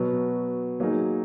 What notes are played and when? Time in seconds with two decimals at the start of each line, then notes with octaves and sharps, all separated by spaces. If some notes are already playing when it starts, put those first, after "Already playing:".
Already playing: B2 F#3 B3
0.80 F#3 A#3 D#4 G#4